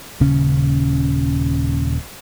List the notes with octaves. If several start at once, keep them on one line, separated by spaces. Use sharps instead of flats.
D#1 C#3 C#4